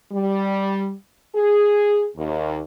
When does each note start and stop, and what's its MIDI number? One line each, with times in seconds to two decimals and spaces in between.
0.12 0.92 55
1.35 2.06 68
2.17 2.59 39